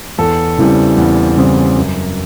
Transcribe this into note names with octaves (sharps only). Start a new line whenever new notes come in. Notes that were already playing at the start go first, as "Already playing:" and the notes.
E2 A4
C#3 E3 G3 C4
E2
C#3 E3 G3 C4
F#2